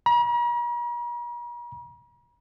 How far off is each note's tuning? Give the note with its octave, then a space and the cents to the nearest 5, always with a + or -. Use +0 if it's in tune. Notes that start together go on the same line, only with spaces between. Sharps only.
A#5 +45